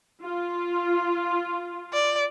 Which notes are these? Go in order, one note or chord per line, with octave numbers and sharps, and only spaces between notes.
F4
D5